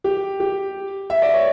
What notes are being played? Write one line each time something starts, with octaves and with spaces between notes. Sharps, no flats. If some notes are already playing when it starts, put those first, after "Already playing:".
G4
G4
E5
D5
C#5